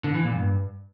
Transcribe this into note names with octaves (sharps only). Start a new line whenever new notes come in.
D3
E3
A#2
G2